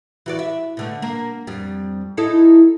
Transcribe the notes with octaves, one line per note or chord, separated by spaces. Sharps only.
E3 F#4 D5
E5
B2 D3 A3
A#3
F2 G3
D#4 E4 A4